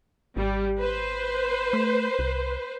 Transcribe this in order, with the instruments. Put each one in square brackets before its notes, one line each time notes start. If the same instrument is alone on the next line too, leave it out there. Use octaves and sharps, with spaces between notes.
[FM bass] G#1 [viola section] G3
[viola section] B4 C5
[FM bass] A3
C2